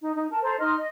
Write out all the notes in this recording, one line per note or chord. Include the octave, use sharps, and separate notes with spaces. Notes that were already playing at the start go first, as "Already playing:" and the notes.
D#4
D#4
A#4 A5
A4 C5 A#5
D#4 D#5 C6 F6
D#5